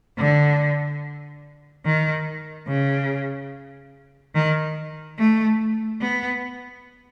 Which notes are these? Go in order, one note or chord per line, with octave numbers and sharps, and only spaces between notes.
D3
D#3
C#3
D#3
A3
B3